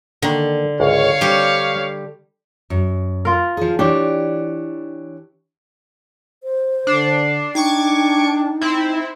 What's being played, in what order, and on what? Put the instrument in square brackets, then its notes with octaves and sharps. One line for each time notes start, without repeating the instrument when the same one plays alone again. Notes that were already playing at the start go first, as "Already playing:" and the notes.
[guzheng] D3 [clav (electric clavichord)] D#3 A#3
[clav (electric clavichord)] G#1 C#2 [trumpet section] C#5 F5
[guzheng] G3 G4 [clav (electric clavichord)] C4 D4
[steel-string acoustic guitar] F#2
[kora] F4 A#4
[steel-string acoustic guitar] F3 G#4
[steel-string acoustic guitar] E3 D4 C#5 [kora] G4
[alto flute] C5
[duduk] D3 [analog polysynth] D4 [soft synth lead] C7
[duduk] D4 [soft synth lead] D#4 [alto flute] G5 [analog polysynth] C#6 D6 G#6
[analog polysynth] C4 E4